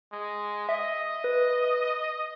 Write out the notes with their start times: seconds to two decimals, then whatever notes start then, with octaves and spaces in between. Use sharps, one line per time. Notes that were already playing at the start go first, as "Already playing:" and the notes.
0.12 G#3
0.69 D#5 E5
1.24 B4